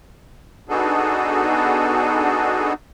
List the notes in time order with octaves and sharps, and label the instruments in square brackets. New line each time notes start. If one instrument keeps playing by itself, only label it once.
[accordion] B3 D4 D#4 F#4 G#4 A4